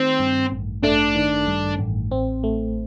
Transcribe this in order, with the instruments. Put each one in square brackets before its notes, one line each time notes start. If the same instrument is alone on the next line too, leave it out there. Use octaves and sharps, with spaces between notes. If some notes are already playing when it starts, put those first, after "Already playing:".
Already playing: [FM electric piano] D#3 A3 [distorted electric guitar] C4
[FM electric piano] G2
A1
[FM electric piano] A3 [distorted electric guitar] D4
[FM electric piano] D#3
G2
A1
C4
A3